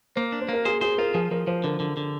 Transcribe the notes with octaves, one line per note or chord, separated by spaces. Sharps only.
A#3 C5
D4
C5
A#3 A#4
G#4 C5
G#4 C5
F4 A#4
F3 G#4
F3 A#4
F3 C5
D3 A#4
D3
D3